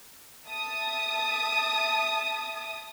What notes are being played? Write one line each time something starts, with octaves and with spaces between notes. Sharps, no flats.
E5 A5 D#6